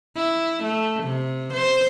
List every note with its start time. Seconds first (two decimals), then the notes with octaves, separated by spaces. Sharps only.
0.16 E4
0.64 A3
1.03 C3
1.54 C5